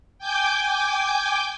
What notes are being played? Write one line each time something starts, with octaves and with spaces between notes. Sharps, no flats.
G5 G#5 D6 G6